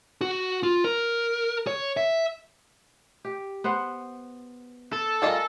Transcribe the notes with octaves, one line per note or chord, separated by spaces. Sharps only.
F#4
F4
A#4
C#5
E5
G4
B3 C5 F#5
A4
G3 F4 G#4 A#4 D#5